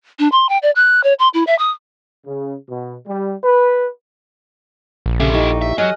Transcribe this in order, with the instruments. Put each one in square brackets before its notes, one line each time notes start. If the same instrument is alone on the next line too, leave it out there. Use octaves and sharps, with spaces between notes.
[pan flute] D4
C6
G5
D5
F#6
C#5
C6
E4
E5
D#6
[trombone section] C#3
B2
G3
B4
[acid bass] A#1
[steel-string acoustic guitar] C#3 [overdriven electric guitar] F4 E5 [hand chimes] G4 A4 D6
[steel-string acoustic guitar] D#4 G4 [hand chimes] E4 C#6
[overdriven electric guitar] E5
[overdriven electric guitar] F#3 [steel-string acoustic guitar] D#5 [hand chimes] G#5 F6 F#6